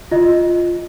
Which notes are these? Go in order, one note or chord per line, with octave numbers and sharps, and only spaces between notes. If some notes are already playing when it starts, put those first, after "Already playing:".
F4 D#5